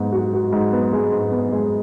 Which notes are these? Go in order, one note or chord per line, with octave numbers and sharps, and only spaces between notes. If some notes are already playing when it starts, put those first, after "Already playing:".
Already playing: G#2 G#3 B3
F#4
F#4
G#2
B3
G#3
G#2
B3
G#3